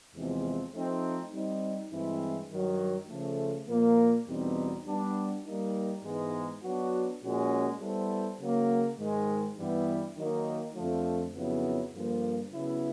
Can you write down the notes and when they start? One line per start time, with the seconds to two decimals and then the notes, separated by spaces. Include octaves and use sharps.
0.14 E2 C3 F3 G#3 C4
0.73 F3 A3 C4 D#4
1.32 G3 C4 D#4
1.91 G2 E3 G#3 C4 E4
2.50 G2 D#3 F#3
3.08 C#3 F3 A3
3.68 A#2 F3 A#3
4.26 E2 B2 G3 C4 D#4
4.85 G3 B3 D4
5.44 G3 A#3 D#4
6.03 G#2 E3 G#3 B3 D#4
6.62 F#3 B3 D4 F#4
7.21 A#2 F3 G#3 C#4 F#4
7.79 G3 B3 E4 A4 C5
8.40 C#3 F#3 A#3
8.97 G#2 D#3 G#3
9.57 G2 E3 G3 B3 E4
10.16 D#3 F#3 A#3 D#4
10.74 F2 D3 F3 A3
11.34 F2 C#3 F#3 B3 E4
11.92 G2 D3 F3 A#3
12.51 C#3 F#3 B3 E4